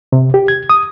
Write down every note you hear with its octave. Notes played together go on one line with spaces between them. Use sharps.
C3
G4
G#6
D#6